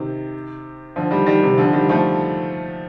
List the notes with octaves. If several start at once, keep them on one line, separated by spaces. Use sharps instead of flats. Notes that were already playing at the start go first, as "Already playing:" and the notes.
Already playing: C3 D#3
D3 F3
D#3 G3
D#3 G3
C3 D#3
D3 F3
D#3 G3
F3 A3